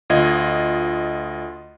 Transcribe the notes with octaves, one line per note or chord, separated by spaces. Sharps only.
D2 F4 D#5 G#6